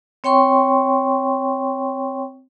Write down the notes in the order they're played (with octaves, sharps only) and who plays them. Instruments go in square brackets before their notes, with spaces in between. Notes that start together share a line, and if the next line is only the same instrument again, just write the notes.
[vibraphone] C4 C#5 G5 C6 C#6